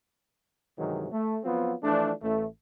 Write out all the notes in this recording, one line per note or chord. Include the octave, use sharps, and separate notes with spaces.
G2 C3 D#3 E3 F#3 G#3
A3
F3 F#3 B3 C4 F4
E3 F3 A3 D4
A1 A3